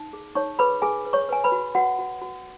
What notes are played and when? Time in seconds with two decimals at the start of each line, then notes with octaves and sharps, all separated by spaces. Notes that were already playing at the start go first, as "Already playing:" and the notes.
Already playing: D#4
0.13 G#4
0.35 D#4 C#5 C#6
0.59 G#4 B4 B5
0.82 G#4 B4 G#5
1.05 B4
1.13 C#5 C#6
1.29 B4 G#5
1.44 B4 B5
1.52 F#4
1.75 F#4 B4 F#5
1.99 F#4
2.22 F#4